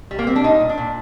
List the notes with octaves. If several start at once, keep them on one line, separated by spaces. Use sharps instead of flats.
G3
A#3
G3 C4
D4
A#2 D#4
A#2
D4
A#2